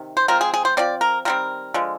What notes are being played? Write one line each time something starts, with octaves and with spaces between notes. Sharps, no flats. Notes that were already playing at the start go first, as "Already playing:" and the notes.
Already playing: C3 D#3
C5
F3 G#3 C4 A#4
G#4
G#4
C5
F3 C4 D5
A#4
D#3 G3 C4 A#4
D3 F3 G#3